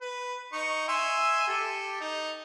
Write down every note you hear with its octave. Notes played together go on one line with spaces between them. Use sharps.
B4
D#4 C#6
E5 G#5 C6
G4 A4
D#4